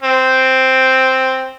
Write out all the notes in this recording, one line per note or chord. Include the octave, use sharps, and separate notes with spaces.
C4